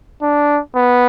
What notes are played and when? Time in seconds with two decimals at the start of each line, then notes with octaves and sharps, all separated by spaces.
0.22 D4
0.76 B3